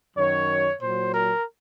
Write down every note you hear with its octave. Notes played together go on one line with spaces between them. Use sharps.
F#2 D#3 F#3 C#5
A#2 F#3 C5
A#4